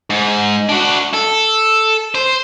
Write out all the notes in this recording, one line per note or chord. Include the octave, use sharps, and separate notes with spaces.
G#2
D4 F#4
A4
C5